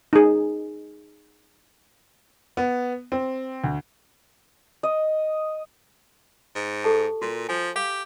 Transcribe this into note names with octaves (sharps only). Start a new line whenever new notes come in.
D#4 G#4
B3
C4
D2
D#5
G#2
G4 A4 A5
A#2 F#4
F3 G#5
G4 F5